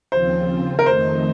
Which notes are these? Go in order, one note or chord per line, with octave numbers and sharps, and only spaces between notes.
D#2 C#3 F3 C4 F4 C5
A#4
F2 D#3 A3 D#4 C5